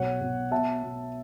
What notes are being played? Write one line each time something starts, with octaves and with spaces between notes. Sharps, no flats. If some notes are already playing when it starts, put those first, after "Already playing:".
Already playing: B1 F#3 C#5 F#5
B1
B2 E5 A5
B2